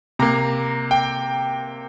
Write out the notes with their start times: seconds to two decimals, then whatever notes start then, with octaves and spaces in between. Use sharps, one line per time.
0.19 C3 A#3 A#5
0.91 G5